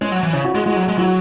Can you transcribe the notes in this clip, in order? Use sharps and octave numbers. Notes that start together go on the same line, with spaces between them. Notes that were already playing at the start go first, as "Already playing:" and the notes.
G#3 C#4
F#3
E3
C#3 C#4
F#4
G#3 G#4
G#3 F#4
F#3
G#4
G#3
F#3 F#4